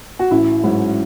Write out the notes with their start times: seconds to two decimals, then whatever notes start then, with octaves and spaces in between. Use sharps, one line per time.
0.19 F#4
0.31 A1 E4
0.63 G#2 F#3 E4